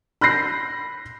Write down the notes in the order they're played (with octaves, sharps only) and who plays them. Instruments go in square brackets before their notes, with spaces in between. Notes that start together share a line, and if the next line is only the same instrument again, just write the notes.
[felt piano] B5 F#6 G6 A#6 C7